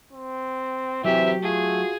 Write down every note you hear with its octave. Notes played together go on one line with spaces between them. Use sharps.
C4
C3 E3 F#3 G4 E5
A3 F4 F#4 G#4